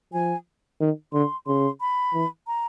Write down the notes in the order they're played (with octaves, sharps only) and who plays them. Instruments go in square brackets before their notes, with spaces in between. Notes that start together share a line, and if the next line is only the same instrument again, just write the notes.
[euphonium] F3 [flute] G#5
[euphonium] D#3
[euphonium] D3 [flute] C6
[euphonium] C#3 [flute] C6
[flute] B5
[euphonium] E3
[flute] A#5